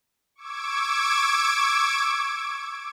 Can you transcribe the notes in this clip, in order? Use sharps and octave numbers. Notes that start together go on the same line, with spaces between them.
C#6 D6 E6 G#6 D7